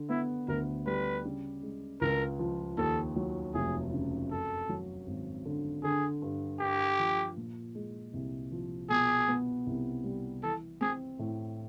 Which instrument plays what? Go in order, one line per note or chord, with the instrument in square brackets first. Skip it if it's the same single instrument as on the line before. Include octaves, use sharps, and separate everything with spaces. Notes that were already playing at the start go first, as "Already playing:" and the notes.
Already playing: [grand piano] D3
[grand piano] B3 [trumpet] E4
[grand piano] D2 [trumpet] A#4
[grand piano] G3 [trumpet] B4
[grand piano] C#3
G#3
[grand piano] C#2 [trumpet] A#4
[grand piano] F3
[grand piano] D#2 [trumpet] A4
[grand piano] F#3
[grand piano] F1 [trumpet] G#4
[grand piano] C#3
[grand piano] F#2 [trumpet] A4
[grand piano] F#3
G#1
D3
[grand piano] D3 [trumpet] G#4
[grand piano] G2
[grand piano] G2 [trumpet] G4
[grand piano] F3
A#2
G#3
C2
F3
[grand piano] B2 [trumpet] G#4
[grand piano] B3
C2
G3
[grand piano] E3 [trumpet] A4
[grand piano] C4 [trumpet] G#4
[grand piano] A2